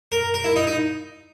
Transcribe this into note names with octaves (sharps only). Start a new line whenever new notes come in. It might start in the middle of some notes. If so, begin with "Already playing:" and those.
A#4
A#4
E4
D#4
D#4